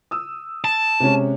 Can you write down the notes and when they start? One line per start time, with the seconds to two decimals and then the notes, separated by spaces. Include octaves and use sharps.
0.11 D#6 E6
0.64 A5
1.00 C3 G#3 C#4